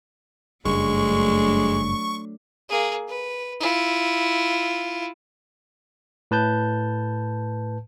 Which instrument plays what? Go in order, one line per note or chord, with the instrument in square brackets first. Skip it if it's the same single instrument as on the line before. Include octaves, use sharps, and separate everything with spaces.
[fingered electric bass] F#1 G2 [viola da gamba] F#3 A3 D4 [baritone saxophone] G#3 [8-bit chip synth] C#6
[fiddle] A#3 G#4
B4
E4 F4
[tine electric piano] A2 B4 A5 G6